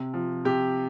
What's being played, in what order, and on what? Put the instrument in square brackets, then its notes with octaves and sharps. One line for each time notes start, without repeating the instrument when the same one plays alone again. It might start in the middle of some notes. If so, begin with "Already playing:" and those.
Already playing: [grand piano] C3
F3
C3 G4